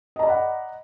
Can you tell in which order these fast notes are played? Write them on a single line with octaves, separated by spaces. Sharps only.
D#5 A#5 D5 B5 F#5